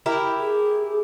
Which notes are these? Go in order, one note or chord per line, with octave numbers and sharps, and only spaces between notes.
E4 G4 A#4
G#4